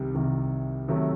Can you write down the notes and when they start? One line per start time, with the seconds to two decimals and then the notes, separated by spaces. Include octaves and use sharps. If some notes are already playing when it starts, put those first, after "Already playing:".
Already playing: C2 C3 D#3 G3
0.15 C2 C3 D#3 G3
0.89 C3 D#3 F#3 A3